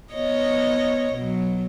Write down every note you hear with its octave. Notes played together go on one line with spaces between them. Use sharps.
B3 C#5 D#5
B2 F#3